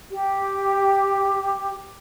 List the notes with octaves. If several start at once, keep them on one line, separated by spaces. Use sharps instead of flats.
G4